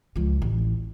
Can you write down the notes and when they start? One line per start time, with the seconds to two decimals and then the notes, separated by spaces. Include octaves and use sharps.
0.16 C#2 F3
0.42 A1 E4